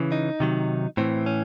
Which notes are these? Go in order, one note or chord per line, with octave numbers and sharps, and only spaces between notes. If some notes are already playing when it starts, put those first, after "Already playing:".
Already playing: C#3 E3
D#4
C3 D#3 F#3
A2 E3 C4
C#4